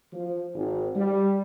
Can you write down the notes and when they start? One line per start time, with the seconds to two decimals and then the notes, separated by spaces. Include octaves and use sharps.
0.13 F3
0.54 G#1
0.96 G3